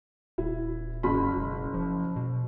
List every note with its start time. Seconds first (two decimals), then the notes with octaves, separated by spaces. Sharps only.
0.38 D#1 E4
1.03 F#1 B5
1.36 E1
1.74 F3
2.16 B2